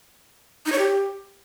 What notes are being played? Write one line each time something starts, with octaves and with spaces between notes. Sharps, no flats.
D#4
C#5
G4